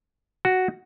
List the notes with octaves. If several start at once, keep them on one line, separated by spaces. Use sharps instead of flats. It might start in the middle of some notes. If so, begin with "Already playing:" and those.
F#4